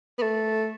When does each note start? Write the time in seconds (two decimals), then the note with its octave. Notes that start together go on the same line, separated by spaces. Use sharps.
0.19 B3
0.22 A3